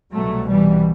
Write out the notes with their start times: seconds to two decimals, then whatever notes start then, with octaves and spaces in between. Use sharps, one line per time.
0.12 C2 B2 F#3 A3
0.47 E3 G3